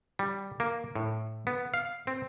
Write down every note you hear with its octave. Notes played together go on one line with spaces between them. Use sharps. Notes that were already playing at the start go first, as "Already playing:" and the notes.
G3
A#3
A2
B3
F5
C4